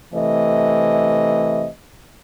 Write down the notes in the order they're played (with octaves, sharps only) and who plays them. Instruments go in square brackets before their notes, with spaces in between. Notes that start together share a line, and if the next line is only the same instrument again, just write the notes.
[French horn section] C3 E3 A3 D#5